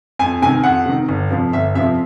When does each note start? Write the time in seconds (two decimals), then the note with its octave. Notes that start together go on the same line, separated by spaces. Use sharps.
0.19 F2 G#5
0.42 C3 G#5
0.46 D#3
0.64 F2 F#5
0.86 C3 D#3
1.08 G1
1.30 F2 C3 F3
1.53 G1 E5
1.75 F2 C3 F3 E5